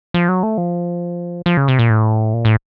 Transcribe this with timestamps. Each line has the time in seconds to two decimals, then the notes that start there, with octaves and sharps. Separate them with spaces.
0.14 F3
0.29 F#3
0.43 A3
0.58 F3
1.46 F3
1.57 C#3
1.68 C3
1.79 A#2
1.90 A2
2.34 A#2
2.45 A2